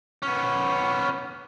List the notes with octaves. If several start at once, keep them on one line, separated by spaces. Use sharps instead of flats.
B3 C#4